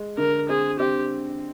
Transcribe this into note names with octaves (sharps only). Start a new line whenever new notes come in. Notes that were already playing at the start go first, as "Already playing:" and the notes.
Already playing: G#3
D3 A#4
C4 G#4
C4 G4